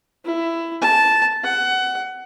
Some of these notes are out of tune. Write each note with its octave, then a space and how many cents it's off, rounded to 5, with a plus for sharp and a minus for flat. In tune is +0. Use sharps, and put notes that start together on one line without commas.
E4 +15
A5 -5
F#5 +20